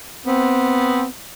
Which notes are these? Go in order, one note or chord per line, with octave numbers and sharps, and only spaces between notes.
B3 C4